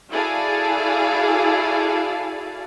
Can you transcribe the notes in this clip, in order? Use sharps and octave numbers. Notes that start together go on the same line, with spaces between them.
E4 F#4 G#4 A4 D5 F5